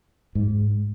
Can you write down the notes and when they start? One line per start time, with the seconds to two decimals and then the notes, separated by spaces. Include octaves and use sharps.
0.35 G#2